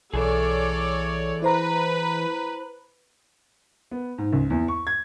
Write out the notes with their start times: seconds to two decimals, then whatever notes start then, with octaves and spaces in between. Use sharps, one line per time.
0.14 B1 E3 G#4 A4 C#5 D5
1.42 E4 B4 C5 A#5
3.91 B3
4.18 G#2
4.33 C#2
4.50 E2
4.68 C#6
4.87 G#6